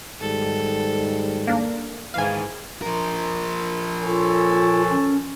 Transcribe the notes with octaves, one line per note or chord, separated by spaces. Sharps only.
G#2 D#3 G3 A4
A#3 D4
G#2 D#3 E3 F5 G#5
F3 A#4
F4 A4 C#5 G#5
C#4